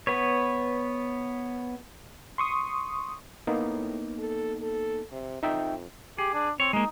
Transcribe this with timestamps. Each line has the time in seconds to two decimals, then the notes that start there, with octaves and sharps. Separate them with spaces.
0.07 B3 B4 C#5
2.38 C6 C#6 D#6
3.47 A2 A#3 B3 D#4
4.19 A4
4.61 A4
5.12 C3
5.43 F2 D#4 E5 G5
6.18 G4 G#4
6.34 D4
6.60 C4 C#5
6.73 G#3 A#3 D#4